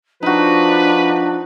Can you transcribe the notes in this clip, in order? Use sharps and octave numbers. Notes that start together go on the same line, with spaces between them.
F3 D4 D#4 F#4 B4